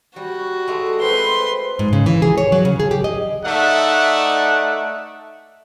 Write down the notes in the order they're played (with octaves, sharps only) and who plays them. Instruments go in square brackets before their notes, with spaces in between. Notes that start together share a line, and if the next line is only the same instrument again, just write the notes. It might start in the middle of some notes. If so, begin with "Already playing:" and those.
[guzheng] G3 [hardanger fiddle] F#4
[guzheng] G#3 A3
[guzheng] C4 [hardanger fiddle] B4 C6
[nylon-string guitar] G#2
C#3
E3
G#4
C#5
F#3
C#3
G#4
G4
D#5
[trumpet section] A3 D#4 D5 E5 F#5